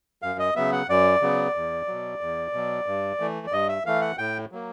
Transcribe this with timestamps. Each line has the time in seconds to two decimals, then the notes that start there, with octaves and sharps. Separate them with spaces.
0.22 F#2 F5
0.39 D#5
0.56 C#3 F#3 B3 E5
0.72 F#5
0.89 F#2 D5
1.22 C#3 F#3 B3
1.55 E2
1.88 B2 F#3
2.21 E2
2.53 B2 F#3
2.86 G2
3.20 E3 A3
3.47 D5
3.52 G2 D#5
3.69 E5
3.86 E3 A3 F5
4.01 F#5
4.18 A2 G5
4.52 F#3 A#3